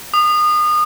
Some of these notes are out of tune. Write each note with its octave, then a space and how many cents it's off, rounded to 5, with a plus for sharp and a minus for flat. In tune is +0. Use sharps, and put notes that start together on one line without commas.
D#6 -30